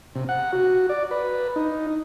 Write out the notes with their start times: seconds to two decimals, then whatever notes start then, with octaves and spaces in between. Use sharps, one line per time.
0.15 C3
0.29 F#5
0.53 F#4
0.89 D5
1.11 B4
1.56 D#4